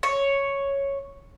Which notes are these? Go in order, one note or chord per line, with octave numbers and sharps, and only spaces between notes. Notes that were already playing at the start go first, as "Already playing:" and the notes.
C#5